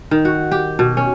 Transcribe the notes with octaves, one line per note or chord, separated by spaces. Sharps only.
D#3
F#4
G4
B2
C#4